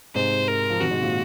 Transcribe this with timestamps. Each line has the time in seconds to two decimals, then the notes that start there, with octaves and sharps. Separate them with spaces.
0.15 G#2 C3 C5
0.48 A#4
0.70 F3
0.80 C3 D#3 F#4
0.91 G#2 C3
1.02 A#2